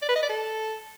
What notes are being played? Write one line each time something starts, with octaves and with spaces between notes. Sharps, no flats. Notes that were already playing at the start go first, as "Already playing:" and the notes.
D5
B4
D#5
D5
A4